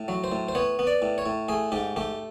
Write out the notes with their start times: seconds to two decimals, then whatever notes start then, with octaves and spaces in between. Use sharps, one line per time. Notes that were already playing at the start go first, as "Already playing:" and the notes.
Already playing: A2
0.08 F#3
0.24 C5
0.32 A2
0.48 C5
0.55 B3 C#5
0.79 B3
0.87 D5
1.02 A2
1.18 C#5
1.26 A2
1.49 A3 G#4
1.72 G#2 G4
1.96 A3 G4